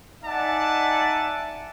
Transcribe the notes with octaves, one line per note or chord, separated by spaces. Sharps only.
D#4 D5 E5 F#5 G#5 A5